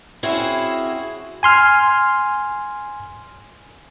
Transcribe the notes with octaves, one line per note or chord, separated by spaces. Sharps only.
C4 C#4 E4 F#4 G#4
G#5 C6 F6